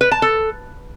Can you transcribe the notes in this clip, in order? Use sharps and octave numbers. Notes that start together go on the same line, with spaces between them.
B4
A5
A4